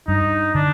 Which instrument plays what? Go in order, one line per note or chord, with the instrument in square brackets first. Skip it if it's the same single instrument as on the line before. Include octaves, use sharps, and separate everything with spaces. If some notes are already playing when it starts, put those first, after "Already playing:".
[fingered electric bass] G2 [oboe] D#4
[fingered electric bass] D3 [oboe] D4